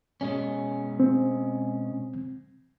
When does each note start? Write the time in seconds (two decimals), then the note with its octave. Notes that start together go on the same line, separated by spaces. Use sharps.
0.21 B2 G#3 C#4
1.00 C4